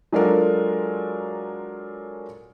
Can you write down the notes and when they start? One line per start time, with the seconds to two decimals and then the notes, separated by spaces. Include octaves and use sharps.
0.12 F#3 G#3 D4 F4 A4 A#4